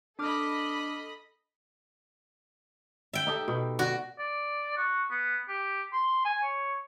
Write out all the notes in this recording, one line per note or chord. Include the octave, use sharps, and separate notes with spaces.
D4 A4 D#5 B5 D6 F6
E5 G5
D#4 G4 A4
B2
F#4 D5
D5
F#4
B3
G4
C6
G#5
C#5